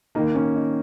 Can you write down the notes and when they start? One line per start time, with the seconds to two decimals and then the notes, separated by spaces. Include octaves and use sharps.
0.15 D#3 A#3 D#4
0.35 C#4
0.56 D#4